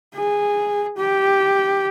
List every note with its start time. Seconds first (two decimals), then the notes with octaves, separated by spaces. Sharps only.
0.16 G#4
0.97 G4